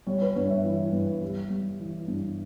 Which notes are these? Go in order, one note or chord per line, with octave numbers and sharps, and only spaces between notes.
G3 C#5
B4
G2 C#5
E5
E3
G2
G3 G4
G3
E3
G2